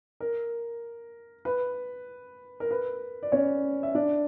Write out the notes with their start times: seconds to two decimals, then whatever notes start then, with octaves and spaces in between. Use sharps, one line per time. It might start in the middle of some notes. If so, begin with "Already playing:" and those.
0.20 A#4
1.45 B4
2.60 A#4
2.71 B4
3.23 D5
3.32 C#4 C#5
3.83 E5
3.95 D4 D5